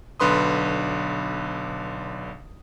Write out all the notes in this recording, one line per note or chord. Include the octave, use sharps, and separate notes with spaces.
B1 D3 B4 C6 D#6